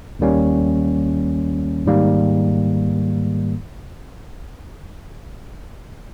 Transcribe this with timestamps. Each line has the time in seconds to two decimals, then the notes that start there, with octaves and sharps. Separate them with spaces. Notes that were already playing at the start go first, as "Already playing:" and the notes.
0.19 D#2 D#3 G3 A#3 C#4
1.86 G#2 D#3 G3 A#3